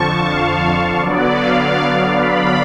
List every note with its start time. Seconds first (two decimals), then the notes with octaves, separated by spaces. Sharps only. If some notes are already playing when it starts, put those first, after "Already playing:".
Already playing: F2 D3 F3 A5 C#6
0.23 F5
1.00 D3 F#3 B3 D5
1.39 F5
2.16 B5